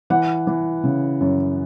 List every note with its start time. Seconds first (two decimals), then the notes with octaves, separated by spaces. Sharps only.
0.10 E3 F#5
0.47 E3
0.84 C#3
1.21 F#2